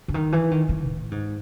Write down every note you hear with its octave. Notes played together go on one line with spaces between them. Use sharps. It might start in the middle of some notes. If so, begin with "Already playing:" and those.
D3
D#3
E3
D#3
D#3
A2
G#2